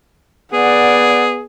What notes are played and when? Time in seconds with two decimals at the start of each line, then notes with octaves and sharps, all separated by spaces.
0.53 B3 G#4 D5 F#5